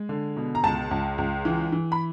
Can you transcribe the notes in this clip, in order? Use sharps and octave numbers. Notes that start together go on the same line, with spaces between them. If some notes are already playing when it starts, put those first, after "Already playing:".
Already playing: G#3
D3
B2
A#5
C#2 A5
C#2
C#2
E3
E3
B5